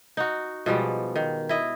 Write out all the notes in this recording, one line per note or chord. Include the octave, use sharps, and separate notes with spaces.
D#4 F#4
B2 F3 G3 G#3
D#3
E4 D#5